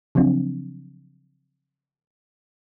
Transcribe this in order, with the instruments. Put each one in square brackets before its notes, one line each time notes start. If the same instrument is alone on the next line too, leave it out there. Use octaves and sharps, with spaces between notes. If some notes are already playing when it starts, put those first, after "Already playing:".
[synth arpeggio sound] C#3 F3 F#3 C4 D4